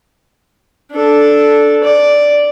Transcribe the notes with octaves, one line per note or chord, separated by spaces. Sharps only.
D4 A4
D5